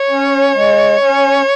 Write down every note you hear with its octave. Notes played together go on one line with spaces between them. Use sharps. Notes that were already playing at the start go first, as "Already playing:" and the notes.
Already playing: C#5
C#4
G#3
C#4